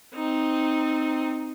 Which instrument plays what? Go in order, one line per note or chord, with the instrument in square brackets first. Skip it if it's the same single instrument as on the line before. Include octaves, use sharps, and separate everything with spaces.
[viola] C4 D#4